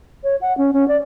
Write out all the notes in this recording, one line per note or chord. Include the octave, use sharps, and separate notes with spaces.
C#5
F#5
C#4
C#4
D5